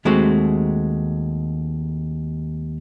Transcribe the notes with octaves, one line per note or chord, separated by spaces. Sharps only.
D#2 G#3 A3 C4 F#4